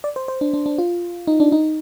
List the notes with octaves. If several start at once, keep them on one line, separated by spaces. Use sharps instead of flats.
D5
C5
C5
D4
D4
D4
F4
D#4
D4
D#4